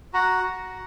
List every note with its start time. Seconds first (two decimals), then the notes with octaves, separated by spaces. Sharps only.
0.13 F#4 F#5 A#5
0.44 F#4